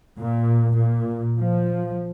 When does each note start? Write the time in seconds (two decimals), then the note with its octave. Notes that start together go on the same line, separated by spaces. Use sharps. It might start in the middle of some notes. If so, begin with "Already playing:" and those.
0.19 A#2
0.73 A#2
1.38 F3